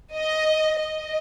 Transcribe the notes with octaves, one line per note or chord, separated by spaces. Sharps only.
D#5
D#5